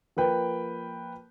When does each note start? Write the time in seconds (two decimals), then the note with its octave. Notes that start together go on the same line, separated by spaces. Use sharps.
0.17 F3 A#3 B4 G5